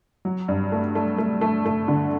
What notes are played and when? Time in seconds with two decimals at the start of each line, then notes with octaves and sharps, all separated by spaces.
0.25 F#3
0.48 G2
0.72 A3
0.95 A3
1.18 A3
1.41 A3
1.65 A3
1.88 D3